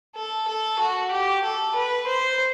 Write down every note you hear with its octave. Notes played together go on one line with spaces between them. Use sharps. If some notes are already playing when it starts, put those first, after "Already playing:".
A4
A4
F#4
G4
A4
B4
C5